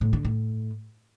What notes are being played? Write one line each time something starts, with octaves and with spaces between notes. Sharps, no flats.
A2
D3
A2